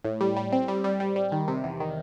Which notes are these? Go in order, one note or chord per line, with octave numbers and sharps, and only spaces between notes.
A2
G3
G3
C4
G3
G3
G3
G3
D#3
C3
E2
D#3